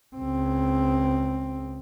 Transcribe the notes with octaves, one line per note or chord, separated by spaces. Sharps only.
C#2 C4